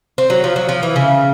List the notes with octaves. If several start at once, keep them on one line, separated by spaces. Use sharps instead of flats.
C4
F#3
F3
F#3
F3
E3
C#3